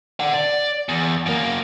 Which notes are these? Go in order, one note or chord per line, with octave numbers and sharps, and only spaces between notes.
D5 F#5
D5
E2
F#2 A#3